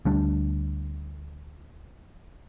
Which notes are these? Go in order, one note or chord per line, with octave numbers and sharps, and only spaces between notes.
D2 G3 D4